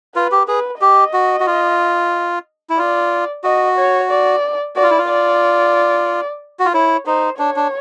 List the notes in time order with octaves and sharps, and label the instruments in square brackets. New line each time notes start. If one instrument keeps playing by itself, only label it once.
[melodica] F4 [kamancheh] B4
[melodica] G4
[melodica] G#4 [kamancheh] B4
[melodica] G4 [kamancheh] D#5
[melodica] F#4
F#4
F4
E4
[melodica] F4 [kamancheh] D5
[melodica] F#4 [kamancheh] D#5
[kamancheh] C#5
D5
[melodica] F#4 [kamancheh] D5
[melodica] F4
E4
F4
[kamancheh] D5
[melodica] F#4
F4
[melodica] E4 [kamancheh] C#5
[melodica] D#4 [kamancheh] C5
[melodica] D4 [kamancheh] C#5
[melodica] D4